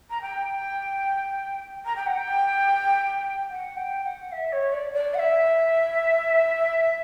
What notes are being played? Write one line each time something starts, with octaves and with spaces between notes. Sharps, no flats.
A#5
G5
A#5
G5
F#5
G5
F#5
G5
F#5
E5
C#5
D5
D5
F#5
E5